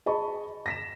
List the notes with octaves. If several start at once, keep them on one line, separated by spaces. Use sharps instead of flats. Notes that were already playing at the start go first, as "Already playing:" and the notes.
G#4 D#5 A5 B5 C#6
A#6 B6 E7